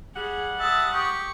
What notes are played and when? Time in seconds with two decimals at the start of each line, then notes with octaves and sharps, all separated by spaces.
0.16 G3 G#4 F#5
0.60 E5 A5 D#6
0.93 G4 C#6